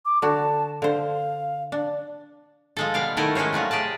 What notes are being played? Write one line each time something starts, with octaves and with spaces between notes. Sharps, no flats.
D6
D3 F#4 A5
D3 C5 F5
D4
F3 G#3 A4
B2 G3 F5 G5
D#3 F#3 A3 E4 A4 A#4
G#3 A3 C#4 C5 C#5
C3 F#3 G3 F4
G4 G#4 D5 A5